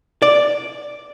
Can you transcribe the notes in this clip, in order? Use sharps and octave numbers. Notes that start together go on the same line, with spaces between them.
D5